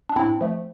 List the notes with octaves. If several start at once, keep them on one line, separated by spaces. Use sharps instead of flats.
D4
A2 C4 E4
F3 A3